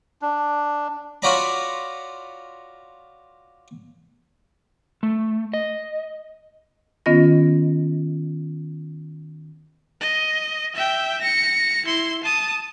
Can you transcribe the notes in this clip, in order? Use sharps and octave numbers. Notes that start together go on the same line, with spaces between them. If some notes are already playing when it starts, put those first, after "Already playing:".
D4
F4 F#4 C#5 D5 A#5 B5
A3
D#5
D#3 B3 C#4 F4 D#5 A#6
D#5
E5 G5
A#6 C#7
E4 C6
A5 D#6